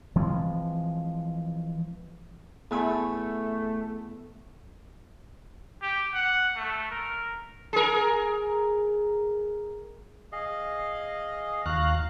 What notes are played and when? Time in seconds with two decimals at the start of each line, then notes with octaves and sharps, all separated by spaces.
0.16 E3 F3 G#3 C4
2.71 E2 A3 G#5 B5
5.82 G4
6.14 F#5
6.56 A3
6.91 A#4
7.73 G#4 A#4
10.32 G#4 D#5 F5
11.66 D#2 F#4 F5 A#5 F#6